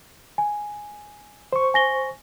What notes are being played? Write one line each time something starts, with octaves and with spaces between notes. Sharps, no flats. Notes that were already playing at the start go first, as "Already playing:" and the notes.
G#5
C5 C#6
G#5 A#6 G7